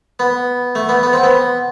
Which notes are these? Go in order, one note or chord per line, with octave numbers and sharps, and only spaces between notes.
B3
A3
B3
B3
C4
B3